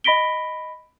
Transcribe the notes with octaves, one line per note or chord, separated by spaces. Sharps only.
D#5 B5 A#6 B6 D7 G7